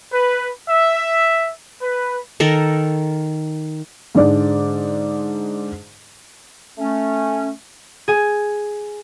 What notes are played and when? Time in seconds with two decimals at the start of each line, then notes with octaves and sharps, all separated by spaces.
0.13 B4
0.70 E5
1.83 B4
2.40 D#3 A4 A#4
4.15 G#2 D3 G#3 D5
6.78 A3 C#4
8.08 G#4 G#5